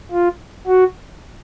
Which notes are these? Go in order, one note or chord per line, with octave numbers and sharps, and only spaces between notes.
F4
F#4